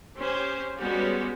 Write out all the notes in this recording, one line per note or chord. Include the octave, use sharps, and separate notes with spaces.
C#4 G4 C5
G3 G#3 B3 C#4 F#4 G4